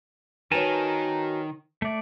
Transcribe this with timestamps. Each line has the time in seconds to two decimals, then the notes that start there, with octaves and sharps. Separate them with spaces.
0.52 D#3 F#4 A#4 B4 C#5 G#5 A5
1.82 A3 D5 E5